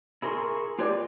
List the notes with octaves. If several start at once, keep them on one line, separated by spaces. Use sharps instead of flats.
E4 G#4 A#4 C6 C#6
F4 G4 B4 C#5 D5
G#3